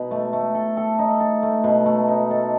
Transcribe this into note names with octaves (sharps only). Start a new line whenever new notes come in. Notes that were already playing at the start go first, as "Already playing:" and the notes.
Already playing: B2 D#4
A3
A3
A4
A4
D#4
A4
A3
B2
A3
D#4
A4